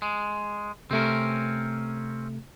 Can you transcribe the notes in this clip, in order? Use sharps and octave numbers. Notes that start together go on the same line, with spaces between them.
G#3
C3 A3 C4 C#4 A#4